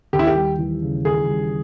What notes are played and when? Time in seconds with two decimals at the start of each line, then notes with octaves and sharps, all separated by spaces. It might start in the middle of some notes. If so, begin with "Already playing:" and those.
0.13 D#2 G4
0.19 E4
0.27 G4
0.35 G3
0.58 E3
0.82 C#3
1.05 D#2 G#4
1.28 G3